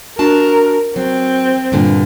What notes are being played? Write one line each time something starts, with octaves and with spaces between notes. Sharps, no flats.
D4 F#4 A#4 A5
F#3 C4
G2 A#2 D3